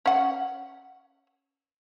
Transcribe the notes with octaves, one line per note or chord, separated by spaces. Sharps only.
C#4 F#5